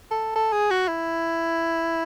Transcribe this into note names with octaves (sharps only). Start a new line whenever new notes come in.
A4
A4
G#4
F#4
E4